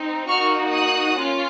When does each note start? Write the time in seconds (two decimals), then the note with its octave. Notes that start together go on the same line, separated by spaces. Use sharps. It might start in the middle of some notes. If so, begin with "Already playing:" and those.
Already playing: C4 D#4
0.28 A#3 D#4 F#4 C#6 F6
0.72 D#6 F#6
1.17 C#4 F4